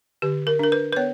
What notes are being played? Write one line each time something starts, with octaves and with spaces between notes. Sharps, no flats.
D3 G4
A#4
D4 A#4
B4
B4
B3 C#5